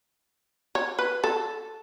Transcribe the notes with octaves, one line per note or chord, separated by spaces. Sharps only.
C#5
B4
A4